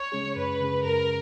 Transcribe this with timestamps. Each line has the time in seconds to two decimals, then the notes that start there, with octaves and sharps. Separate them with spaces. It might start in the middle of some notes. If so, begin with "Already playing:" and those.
Already playing: C#5
0.12 C#3 G#3 C#4 G#4
0.36 F#2 B4
0.61 C#3 G#3 C#4 G#4
0.84 F#2 A#4